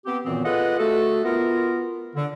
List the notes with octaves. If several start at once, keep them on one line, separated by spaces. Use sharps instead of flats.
B3 C4 G4
F#2 A#2 D#3 E3 B3 C4
F4 G#4 A4 B4 D#5 F#5
A3 F#4 A4
B3 F4 A#4
D3